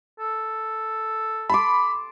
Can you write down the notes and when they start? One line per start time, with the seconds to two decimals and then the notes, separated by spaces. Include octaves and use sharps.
0.19 A4
1.50 A5 B5 C6 D6